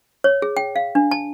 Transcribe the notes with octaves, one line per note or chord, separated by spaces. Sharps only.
C#5
G#4
G5
F5
D4
A5